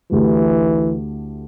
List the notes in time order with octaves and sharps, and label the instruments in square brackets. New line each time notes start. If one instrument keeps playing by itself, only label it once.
[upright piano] D2 D3 A3 E4 G4 [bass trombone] E3